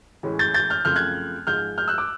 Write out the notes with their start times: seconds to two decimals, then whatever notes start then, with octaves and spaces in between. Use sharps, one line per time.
0.23 A2 E3 G#3 C#4
0.39 G6 A6
0.54 G6 A6
0.70 F6 G6
0.85 F#2 C#3 F3 A3 C4 F6 G6
0.96 F#6 G#6
1.47 G#2 F3 G#3 F6 G6
1.78 F6 G6
1.88 E6 F#6
1.98 D6 E6